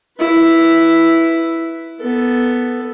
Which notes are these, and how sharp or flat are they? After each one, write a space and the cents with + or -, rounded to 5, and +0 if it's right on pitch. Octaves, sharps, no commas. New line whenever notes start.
E4 +0 B4 +0
B3 +0 A4 +0